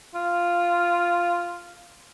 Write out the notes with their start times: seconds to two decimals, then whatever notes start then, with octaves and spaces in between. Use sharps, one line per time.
0.15 F4